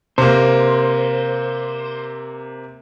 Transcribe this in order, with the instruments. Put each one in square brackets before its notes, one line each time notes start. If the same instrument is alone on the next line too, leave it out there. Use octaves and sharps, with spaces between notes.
[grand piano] C3 A#3 [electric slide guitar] C5